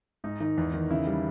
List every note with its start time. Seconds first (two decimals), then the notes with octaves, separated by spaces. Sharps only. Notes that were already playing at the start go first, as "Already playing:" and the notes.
0.24 G#2 D#4
0.40 D#3 D#4
0.57 E2
0.74 D#3
0.90 C#3 E4
1.07 G3